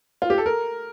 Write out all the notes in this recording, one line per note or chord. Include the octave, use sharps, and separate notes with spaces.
F4
G4
A4
A#4